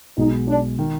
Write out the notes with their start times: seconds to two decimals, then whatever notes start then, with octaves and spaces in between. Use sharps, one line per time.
0.17 B1 B2 G#3 D#4
0.48 D4
0.79 D#3